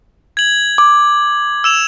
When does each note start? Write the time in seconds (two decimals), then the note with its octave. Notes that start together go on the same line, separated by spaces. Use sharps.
0.37 G#6 F#7
0.78 D6
1.64 E6 E7 F7